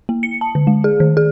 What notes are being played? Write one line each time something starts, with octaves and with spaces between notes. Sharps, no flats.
A#3
C#7
A5
D3
G#3
G#4
D#3
G#4